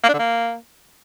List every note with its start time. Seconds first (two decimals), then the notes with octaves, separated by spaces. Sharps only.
0.04 A#3
0.09 D4
0.14 D3
0.19 A#3